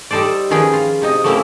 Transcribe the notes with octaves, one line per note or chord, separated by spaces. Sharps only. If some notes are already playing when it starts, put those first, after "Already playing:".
G3 D#4 A4 C5 D5
D#3 F3 C#4 G#4 B4 G5
F4
C3 D#4 D#5
F#3 A3 A#3 C4 C#4 E4